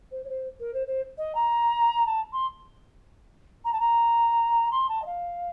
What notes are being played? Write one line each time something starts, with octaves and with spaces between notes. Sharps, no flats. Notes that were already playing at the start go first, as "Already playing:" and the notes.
C5
C#5
C5
A#4
C5
C5
D#5
A#5
A5
C6
A#5
A5
A#5
C6
A5
D#5
F5